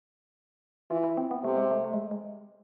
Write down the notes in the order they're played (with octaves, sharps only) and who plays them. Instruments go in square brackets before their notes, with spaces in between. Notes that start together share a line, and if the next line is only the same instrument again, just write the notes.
[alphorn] E3 [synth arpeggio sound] F4
[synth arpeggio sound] E4
C4
B3
[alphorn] C3 [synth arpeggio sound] A3
[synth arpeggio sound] G#3
A3
A3
G#3
G#3